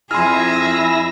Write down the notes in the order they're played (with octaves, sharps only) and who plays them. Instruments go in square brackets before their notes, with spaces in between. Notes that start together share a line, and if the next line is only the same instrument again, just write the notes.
[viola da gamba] F2 G#4 [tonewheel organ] E4 E6 A#6 [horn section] G#5 [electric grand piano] C6 F6